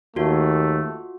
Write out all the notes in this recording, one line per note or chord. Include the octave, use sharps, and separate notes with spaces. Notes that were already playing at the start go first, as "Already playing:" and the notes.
D#2 A3 F4 F#4